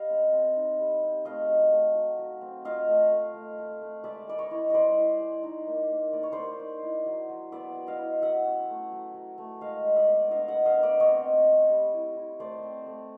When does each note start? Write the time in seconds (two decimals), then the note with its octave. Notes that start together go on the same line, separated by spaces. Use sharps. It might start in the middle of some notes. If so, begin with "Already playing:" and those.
Already playing: G3 D#5 F5
0.10 C4
0.33 C4
0.56 D#4
0.79 G3
1.03 C4
1.25 A3 D#5 F5
1.49 F#3
1.72 A3
1.95 F#3
2.19 F#3
2.41 C4
2.65 F4 D#5 F5
2.88 A3
3.11 A3
3.34 A3
3.58 A3
3.81 A3
4.04 G#3 D5 E5
4.28 G#3 D5
4.39 C#5 D#5
4.51 E4
4.70 G#3 C5 D5 D#5
4.97 E4
5.20 G#3
5.43 D#4
5.67 A#3
5.90 A#3
6.13 A#3 D5
6.23 C#5
6.32 A#3 C5 D5
6.60 D#4
6.83 E4
7.06 F#3
7.29 F#3
7.52 B3 D5 E5
7.75 F#3
7.87 D#5 F5
7.98 E4
8.22 F#3 E5 F#5
8.45 C#4
8.69 A3
8.92 F#3
9.14 F#3
9.38 A3
9.61 G#3 D#5 F5
9.85 G#3
9.96 D5 E5
10.08 B3
10.30 D4 D#5 F5
10.48 E5 F#5
10.54 B3
10.65 D#5 F5
10.78 B3
10.83 D5 E5
11.00 C4 C#5 D#5
11.24 C4
11.47 C4
11.70 G3
11.93 E4
12.16 E4
12.39 A3 C5 D5
12.63 C4
12.86 A3